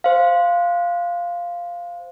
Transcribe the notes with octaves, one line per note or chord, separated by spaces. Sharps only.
C5 F5